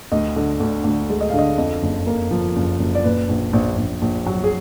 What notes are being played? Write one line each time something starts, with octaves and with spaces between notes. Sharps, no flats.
D2 D#5
D3
D2
D2
G#3
D#5
D3 F5
D#5
F2 D#5
F#1
A#3
F3
F#1
F#1
D5
A#2 B4
A#1
A#1
A#1
A#1
F#3
G#4